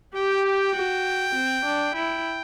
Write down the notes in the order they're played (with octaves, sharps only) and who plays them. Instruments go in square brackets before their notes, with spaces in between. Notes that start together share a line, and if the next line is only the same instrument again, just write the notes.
[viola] G4 [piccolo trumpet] G5
[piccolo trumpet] G5
[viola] F#4
C4
D4
[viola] E4 [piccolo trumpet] G5